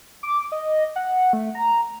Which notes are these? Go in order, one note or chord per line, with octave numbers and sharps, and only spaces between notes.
D6
D#5
F#5
A3
A#5